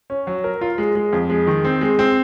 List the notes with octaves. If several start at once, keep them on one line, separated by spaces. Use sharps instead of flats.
C#4
F#3
A#4
F4
G#3
G#3
F2
G#3
D#3
C4
G#3
C4